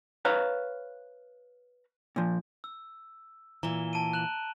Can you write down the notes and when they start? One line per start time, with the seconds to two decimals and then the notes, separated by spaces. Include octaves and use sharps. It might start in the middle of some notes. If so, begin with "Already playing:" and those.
0.25 B4 C#5 F5 A#5
2.16 A#2 F3
2.64 E6
3.63 A#2 E3 A#5 E7 G7
3.93 A5 D7 D#7
4.13 F#6 E7 F#7